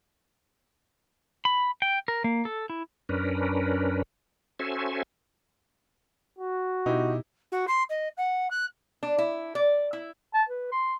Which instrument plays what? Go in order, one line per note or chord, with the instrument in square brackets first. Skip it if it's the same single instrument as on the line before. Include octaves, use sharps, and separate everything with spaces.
[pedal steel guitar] B5
G5
A#4
A#3
A4
E4
[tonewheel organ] F#2 C#4 D4 A#4 B4
C#4 F#4 A4 C5 E5 G#5
[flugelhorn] F#4
[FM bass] B2 [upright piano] D#4 E4 G4
[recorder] F#4
C6
D#5
F#5
F#6
[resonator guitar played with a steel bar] D4
E4
D5
E4
[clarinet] A5
B4
C6